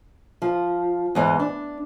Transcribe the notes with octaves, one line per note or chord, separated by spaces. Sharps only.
F3
E2 G#2 E3 D#5
D4